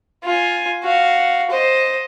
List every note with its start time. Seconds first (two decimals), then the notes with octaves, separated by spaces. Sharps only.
0.24 F4 G#5
0.83 F#4 F5
1.50 C5 D#5